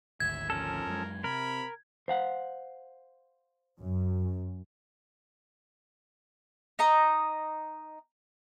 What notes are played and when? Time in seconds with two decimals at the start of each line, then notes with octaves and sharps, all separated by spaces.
0.20 G#1 D2 E5 G#6
0.50 F3 C#4 A4 A#4
0.86 F#2 G#3
1.24 C3 A#4 B5
2.08 C5 F5 F#5
3.79 F#2
6.79 D#4 D#5 A#5